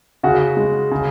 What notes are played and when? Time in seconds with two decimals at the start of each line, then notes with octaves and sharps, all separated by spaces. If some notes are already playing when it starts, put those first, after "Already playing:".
0.23 C#3 F#4
0.57 G#3
0.91 C#3